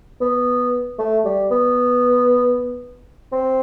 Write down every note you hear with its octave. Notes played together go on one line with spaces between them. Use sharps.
B3
A3
G3
B3
C4